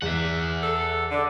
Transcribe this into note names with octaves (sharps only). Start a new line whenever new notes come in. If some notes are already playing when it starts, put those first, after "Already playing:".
E2 E5 F#5
A4
D3